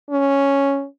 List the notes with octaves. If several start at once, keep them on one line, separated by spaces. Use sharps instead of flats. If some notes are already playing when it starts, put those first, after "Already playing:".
C#4